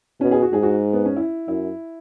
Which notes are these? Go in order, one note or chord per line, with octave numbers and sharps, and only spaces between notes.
B2 C#4
G#4
F#4
G#2 G#4
F#4
B3
C#4
E4
F#2 E4